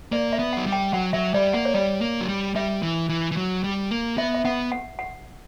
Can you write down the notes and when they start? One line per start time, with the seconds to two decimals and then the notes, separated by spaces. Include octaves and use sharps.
0.12 A#3 D5
0.33 E5
0.39 B3
0.53 F#3 F#5
0.66 G3
0.72 G5
0.93 F#3 F#5
1.13 F#3 E5
1.34 G3 D5
1.53 A#3 F#5
1.65 C#5
1.74 G3 D5
2.01 A#3
2.21 F#3
2.28 G3
2.55 G3 E5
2.83 E3
3.09 E3
3.32 E3
3.37 F#3
3.64 G3
3.91 A#3
4.18 B3 E5
4.34 E5
4.45 B3 F#5
4.72 F#5
4.99 F#5